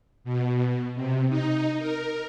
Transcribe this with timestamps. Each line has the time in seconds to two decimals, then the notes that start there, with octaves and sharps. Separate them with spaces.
0.24 B2
0.95 C3
1.30 D#4
1.79 A#4